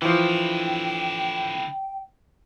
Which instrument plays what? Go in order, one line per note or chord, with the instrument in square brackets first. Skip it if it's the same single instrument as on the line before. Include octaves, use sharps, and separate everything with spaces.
[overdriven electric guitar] D3 E4 [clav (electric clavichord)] E3 F3 [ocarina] G5